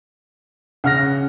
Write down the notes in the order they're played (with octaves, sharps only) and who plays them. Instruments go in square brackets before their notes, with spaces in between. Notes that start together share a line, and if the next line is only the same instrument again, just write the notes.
[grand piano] C#3 F6 A#6 [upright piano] F#5